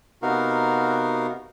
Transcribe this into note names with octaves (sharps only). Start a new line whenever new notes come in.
C3 B3 D#4 F#4 A#4 F5